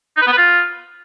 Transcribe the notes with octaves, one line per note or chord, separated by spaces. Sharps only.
D#4
B4
B3
B4
F4